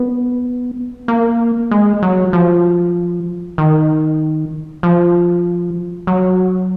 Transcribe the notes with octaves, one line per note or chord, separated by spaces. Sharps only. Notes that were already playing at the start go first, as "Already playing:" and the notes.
Already playing: B3
A#3
G#3
F#3
F3
D#3
F3
F#3